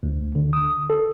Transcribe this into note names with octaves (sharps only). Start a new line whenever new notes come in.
D2
D3
D#6
A4